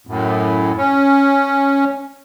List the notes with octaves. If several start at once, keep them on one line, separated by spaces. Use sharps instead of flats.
F#2 A2
C#4